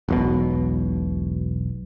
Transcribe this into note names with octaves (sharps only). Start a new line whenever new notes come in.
E1 B1 B2